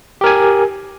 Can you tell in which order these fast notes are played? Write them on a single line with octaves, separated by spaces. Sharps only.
G4 A#4 G#5